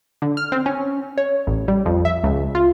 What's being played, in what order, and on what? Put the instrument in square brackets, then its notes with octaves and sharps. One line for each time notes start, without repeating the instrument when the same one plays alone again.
[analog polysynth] D3
F6
C4
C#4
C#5
A1
G3
F2
E5
C#2
F4